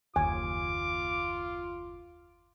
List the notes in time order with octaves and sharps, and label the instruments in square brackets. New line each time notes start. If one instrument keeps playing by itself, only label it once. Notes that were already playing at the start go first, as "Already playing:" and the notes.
[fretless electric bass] F#1 D#2 [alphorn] F4 [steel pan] G#5 [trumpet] D6